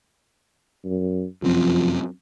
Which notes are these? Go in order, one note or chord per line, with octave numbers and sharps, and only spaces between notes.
F#2
F1 F#2 F3 C4